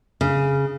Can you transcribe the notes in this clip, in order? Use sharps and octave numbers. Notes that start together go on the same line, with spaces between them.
C#3